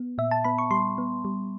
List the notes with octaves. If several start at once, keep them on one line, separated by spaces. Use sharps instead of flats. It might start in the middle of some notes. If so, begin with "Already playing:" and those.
Already playing: B3
A#2 E5
A5
B3 B5
C#6
G3 C6
B3
G3